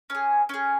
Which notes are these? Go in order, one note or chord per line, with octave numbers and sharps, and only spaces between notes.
C#4 G#4
C#4 G#4